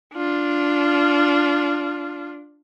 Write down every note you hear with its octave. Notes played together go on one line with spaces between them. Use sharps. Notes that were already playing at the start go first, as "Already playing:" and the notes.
D4 F4